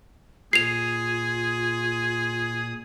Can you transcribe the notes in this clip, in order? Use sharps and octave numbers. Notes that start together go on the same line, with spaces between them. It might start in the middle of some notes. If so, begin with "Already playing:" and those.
A#2 F4 G#4 D#6 C7 F7